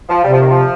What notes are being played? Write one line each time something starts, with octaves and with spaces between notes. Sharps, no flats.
F3
C3 G3
F3
D#3
F3